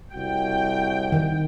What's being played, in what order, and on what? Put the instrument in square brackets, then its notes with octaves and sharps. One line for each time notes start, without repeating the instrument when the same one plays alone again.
[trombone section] C2 F#4 [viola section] G5
[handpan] D#3